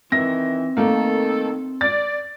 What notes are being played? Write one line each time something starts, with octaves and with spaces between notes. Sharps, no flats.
D#3 E3 C4 E5 A#6
D#3 A3 A#3 A4
D5 A6